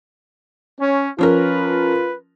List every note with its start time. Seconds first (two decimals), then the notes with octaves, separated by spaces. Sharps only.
0.80 C#4
1.18 F3 C#4 F4 A#4 B4